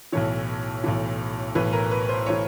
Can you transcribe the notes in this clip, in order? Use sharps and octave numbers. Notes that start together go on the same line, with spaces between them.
B1 A2 E3 C#5
B1 A2 E3
B1 A2 E3 B4
A#4
B4
C5
A2 E3 C#5